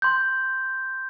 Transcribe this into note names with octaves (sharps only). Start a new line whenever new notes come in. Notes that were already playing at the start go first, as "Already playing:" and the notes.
C6 G6